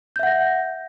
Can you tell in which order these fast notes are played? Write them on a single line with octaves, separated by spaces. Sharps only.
G6 E5 F#5 A#6